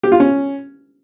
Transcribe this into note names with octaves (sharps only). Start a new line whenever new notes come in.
G4
F4
C#4